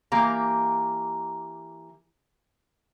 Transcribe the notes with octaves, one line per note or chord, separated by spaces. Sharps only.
E3 A#3 G4 F5 A#5